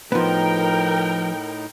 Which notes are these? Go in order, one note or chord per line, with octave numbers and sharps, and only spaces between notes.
A2 F3 B3 D#4 A#4 G5